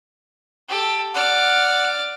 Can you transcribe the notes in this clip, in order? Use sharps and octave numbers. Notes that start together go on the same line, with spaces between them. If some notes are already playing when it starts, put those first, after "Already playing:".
G4 A4
D5 F#5 F6